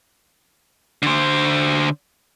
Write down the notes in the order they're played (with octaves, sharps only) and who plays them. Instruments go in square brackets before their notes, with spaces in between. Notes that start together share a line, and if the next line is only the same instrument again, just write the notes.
[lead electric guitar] D3 C5